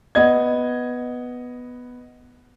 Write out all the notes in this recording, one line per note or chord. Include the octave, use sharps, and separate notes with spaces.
B3 D#5 G#6